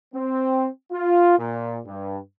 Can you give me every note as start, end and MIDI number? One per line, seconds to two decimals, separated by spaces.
0.14 0.67 60
0.92 1.37 65
1.38 1.79 46
1.86 2.18 43